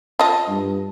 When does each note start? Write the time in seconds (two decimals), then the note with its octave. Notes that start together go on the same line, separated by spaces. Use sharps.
0.19 F4 D#5 A5
0.48 G2